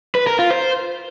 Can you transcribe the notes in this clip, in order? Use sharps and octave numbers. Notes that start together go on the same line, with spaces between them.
B4
A#4
F4
C5